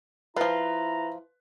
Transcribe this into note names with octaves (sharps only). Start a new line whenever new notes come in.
F3 E4 F4 B4 A#5